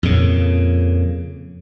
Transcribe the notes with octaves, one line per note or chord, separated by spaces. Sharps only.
F2 A#2 C#3